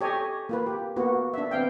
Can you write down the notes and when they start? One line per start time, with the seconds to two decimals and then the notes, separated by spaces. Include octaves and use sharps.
0.01 G4 A4 C#5 D#5 G#5
0.49 A#3 F4 B4
0.66 G4
0.96 A#3 B3 F#4
1.34 D4 E5
1.51 B3 C4 F5 G5